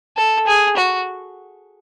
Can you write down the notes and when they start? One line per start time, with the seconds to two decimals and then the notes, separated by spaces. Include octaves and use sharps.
0.17 A4
0.47 G#4
0.77 F#4